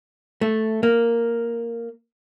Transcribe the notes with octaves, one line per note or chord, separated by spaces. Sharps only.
A3
A#3